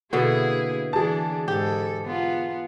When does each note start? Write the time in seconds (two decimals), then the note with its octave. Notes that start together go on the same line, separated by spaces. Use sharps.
0.13 B2 D3 A#3 B3 E4 G#4
0.93 E3 D4 G#4 A5
1.48 G#2 G4 A4
2.06 B3 F4